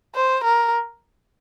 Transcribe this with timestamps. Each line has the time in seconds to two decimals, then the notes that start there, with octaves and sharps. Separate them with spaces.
0.15 C5
0.45 A#4